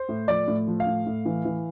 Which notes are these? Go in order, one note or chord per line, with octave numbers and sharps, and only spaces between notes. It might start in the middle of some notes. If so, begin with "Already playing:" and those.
Already playing: C5
A2
F3 D5
A2
F3
F5
A2
A2
E3
E3